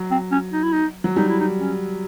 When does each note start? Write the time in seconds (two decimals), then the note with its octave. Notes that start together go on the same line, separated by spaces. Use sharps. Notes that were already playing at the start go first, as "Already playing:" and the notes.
Already playing: F#3
0.11 C4
0.31 C#4
0.53 D#4
0.63 E4
0.73 D#4
1.04 F#3
1.16 G3 D#4
1.29 E4
1.40 D#4
1.59 C#4